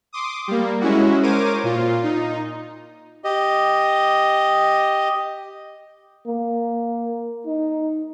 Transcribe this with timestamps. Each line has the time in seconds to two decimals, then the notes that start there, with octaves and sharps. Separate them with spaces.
0.13 C6 D6 D#6
0.48 G3 A#3
0.81 G#3 C#4 E4 F#4
1.23 A#4 C5 C#5 D6 D#7
1.63 A#2 F4
2.03 D#4
3.24 G4 D#5
6.27 A#3
7.47 D#4